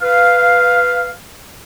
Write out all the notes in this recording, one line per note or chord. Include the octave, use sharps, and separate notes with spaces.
B4 F5